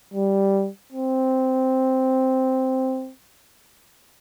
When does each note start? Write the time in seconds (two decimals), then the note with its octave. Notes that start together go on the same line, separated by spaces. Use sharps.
0.14 G3
0.92 C4